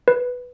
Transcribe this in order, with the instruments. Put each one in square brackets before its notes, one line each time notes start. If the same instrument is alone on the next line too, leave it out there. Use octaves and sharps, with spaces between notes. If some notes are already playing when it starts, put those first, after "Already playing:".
[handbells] B4